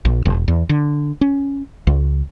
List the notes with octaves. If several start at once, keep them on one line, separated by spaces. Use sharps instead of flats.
A#1
E1
E2
D3
C#4
C#2